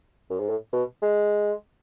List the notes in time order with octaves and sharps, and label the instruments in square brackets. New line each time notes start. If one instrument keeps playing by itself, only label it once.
[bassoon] F#2
G#2
A2
B2
G#3